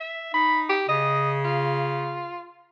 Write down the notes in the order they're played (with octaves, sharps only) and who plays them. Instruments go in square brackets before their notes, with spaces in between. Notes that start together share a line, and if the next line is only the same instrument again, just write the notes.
[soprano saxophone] E5
[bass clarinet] D#4 [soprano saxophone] B5
[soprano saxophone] G4
[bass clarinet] C#3 [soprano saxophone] D#5
[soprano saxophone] F4